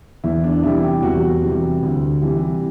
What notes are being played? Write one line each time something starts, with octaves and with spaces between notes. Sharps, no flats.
E2 E4
D4
C3 E3 G3 E4
G4
E2 F#4
C3 E3 G3
D2
C3 E3 G3